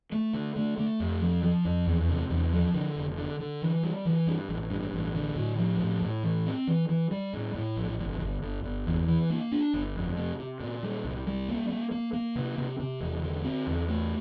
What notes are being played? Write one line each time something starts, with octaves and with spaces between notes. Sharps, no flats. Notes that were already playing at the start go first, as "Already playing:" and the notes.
A3
D3
A3
A3
F2
F3
F3
F2
E2
C3
E2
F3
D3
F1
D3
D3
E3
G3
E3
G2
A1
G2
A1
D3
A2
F3
A2
A2
E3
C4
E3
E3
G3
A2
A2
A#1
G1
G1
G1
G1
E2
E3
A#3
D4
G1
F2
C3
C3
A#2
G3
C2
G3
A#3
A#3
A#3
A#3
C3
C3
C3
E1
D3
C4
E2
A3